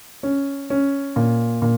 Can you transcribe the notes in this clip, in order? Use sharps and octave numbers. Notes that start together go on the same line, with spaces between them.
C#4
C#4
A#2
A#2